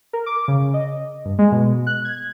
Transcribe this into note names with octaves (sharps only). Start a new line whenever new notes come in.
A#4
D6
C#3
D#5
G2
G#3
B2
F#6
G#6